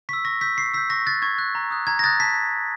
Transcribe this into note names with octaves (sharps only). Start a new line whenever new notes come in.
C#6 E6 B6
C#6 A#6
E6 G6 B6
C#6 C7
E6 G6 B6
C#6 A#6
F#6 A6
C#6 G#6
F#6
A#5
D#6 F#6
A#5 G#6
A#6
D#6 F#6 A6
A5 B6